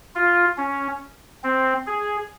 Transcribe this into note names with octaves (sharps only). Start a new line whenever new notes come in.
F4
C#4
C4
G#4